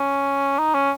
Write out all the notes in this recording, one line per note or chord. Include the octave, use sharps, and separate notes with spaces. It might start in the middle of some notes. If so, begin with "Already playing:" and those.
Already playing: C#4
D#4
C#4